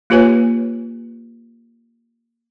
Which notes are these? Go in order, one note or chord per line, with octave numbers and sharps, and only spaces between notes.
A#3 F4 G4 B4 C#5 G#5